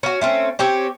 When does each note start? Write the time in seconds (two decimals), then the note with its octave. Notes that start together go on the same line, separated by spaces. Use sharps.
0.03 C#4 F#4
0.21 A3 C4 C#4
0.59 C4 C#4 G4 C#5